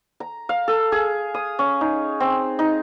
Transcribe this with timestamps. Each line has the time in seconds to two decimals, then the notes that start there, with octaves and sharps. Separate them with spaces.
0.20 A#5
0.49 F5
0.68 A4
0.92 G#4
1.34 D#6
1.59 C#4
1.81 D#4
2.20 C4
2.59 D#4